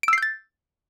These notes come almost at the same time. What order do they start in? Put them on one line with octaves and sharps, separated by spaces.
D7 E6 C7 G6 A6